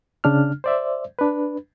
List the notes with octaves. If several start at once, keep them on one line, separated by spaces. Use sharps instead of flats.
C#3 D4 F6
C5 D5 E5
D4 B4